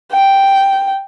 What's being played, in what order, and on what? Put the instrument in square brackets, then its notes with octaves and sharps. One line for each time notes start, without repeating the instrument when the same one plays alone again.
[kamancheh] G5